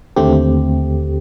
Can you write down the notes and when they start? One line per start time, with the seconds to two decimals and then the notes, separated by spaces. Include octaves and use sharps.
0.16 D#2 D3 A3 C4 G4